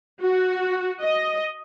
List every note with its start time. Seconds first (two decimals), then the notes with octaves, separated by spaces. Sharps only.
0.22 F#4
1.01 D#5